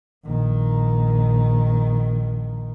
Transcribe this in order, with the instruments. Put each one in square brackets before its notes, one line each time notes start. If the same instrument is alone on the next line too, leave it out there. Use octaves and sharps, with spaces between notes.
[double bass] A#1 D#3